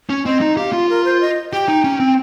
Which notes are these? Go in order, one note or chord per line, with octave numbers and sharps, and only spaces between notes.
C#4
C4 D#5
D#4
G4 F5
F4
A#4
C5
D#5
G4 G5
D#4
C#4
C4